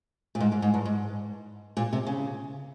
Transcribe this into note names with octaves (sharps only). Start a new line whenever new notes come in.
A#2
G#2
G#2
G#2
G2
G#2
A#2
C3
C#3